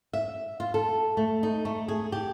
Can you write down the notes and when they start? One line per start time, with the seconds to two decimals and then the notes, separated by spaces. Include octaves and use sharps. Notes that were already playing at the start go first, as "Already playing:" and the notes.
0.13 E5
0.60 F4
0.74 A4
1.17 A3
1.43 D#4
1.65 A3
1.88 G#4
2.12 G4